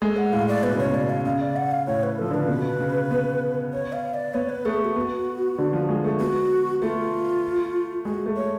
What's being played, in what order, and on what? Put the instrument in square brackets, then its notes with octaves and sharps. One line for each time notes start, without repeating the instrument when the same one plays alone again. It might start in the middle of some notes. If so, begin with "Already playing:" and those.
[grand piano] G#3 [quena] A4
[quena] F#5
[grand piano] A2 [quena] F5
[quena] D5
[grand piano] B2 [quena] B4
[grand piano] C#3 [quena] C#5
[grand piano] B2
[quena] D5
F5
[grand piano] C#3 [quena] F5
[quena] D5
F#5
F5
[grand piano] A2 [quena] C#5
[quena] B4
[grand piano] F3 [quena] A4
[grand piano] D3 [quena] B4
[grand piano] C#3
B2
C#3
B3
[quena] C#5
F5
D5
[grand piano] B3 [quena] C#5
[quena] B4
[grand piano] A3 [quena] G#4
[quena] G#4
F#4
[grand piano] B3
D3
F3
G#3
A3
[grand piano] B3 [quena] F#4
[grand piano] A3 [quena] F4
[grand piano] G#3 [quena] F#4
[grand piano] A3
[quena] C#5